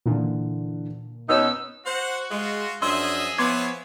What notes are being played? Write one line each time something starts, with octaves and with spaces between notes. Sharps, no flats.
A#2 D3 E3
B2 B3 C#4 D#4 E6
F#4 C5 F#5
G#3 F4
F#2 F3 D4 G#4 D#5 E5 C6 E6
F3 B3 E4 C#5 C6 D6 G#6